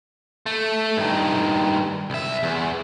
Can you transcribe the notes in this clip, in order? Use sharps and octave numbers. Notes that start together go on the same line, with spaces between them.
A3
G2 D#3
C2 E5
E2